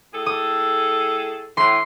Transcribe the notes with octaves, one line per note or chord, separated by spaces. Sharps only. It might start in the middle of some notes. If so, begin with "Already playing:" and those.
A2 G#4 A4
D#6
A2 E3 C6 C7